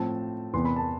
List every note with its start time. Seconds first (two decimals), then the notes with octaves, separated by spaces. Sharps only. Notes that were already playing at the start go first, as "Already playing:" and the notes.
Already playing: A2 F3 C4 A5
0.53 E2 C3 E3 B3 C6
0.65 B5
0.76 A5